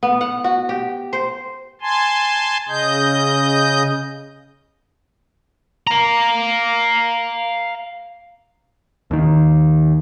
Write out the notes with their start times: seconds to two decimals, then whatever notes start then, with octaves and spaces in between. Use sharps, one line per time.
0.03 B3
0.21 F#5
0.44 F#4
0.69 G4
1.13 C5
1.82 G#5 A5 C6
2.68 C#3 D#5 G6
5.87 F5 A#5
9.11 D#2 D#3